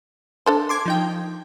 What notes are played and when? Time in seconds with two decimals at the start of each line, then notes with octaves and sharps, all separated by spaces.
0.46 D4 A4 C5
0.69 C6 D6 G#6
0.86 F3 D#4 G5